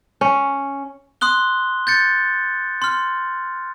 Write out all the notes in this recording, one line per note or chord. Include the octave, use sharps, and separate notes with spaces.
C#4
C6 D#6 F#6 G7
G6 A6 C#7
C6 F6